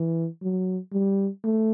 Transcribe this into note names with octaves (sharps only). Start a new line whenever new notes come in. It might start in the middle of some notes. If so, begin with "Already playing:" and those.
Already playing: E3
F#3
G3
A3